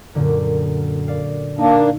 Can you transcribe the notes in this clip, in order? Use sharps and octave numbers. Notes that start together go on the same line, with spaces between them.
F#2 A#2 D3
D5 F5
A#3 D4 D#4